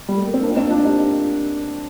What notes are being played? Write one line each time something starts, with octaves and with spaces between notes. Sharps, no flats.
G3
A3
A#3
C4
A#3 D4
F4
C4 D#4
D4 F4
D#4 G4